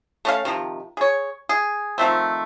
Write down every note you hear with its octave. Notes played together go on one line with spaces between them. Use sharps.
A3 C#4 F5
C3 D#3 F3
G#4 C#5
G#4
D#3 F3 A3 C4